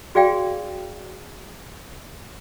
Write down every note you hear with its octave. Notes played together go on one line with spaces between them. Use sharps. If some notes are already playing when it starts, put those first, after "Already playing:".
F#4 G#4 D5 F5 G5